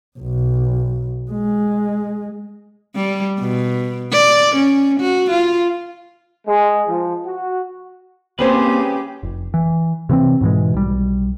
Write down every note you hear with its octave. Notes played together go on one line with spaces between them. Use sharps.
B1
G#3
G3
B2
D5
C#4
F#4
F4
G#3
F3
F#4
A#3 C4 C#4 G4 G#4 B4 C5
F1
E3
C3 E3 B3 C4
G#2 B2 E3 G#3
B1 G3